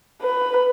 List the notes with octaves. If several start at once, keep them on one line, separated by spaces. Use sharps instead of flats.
B4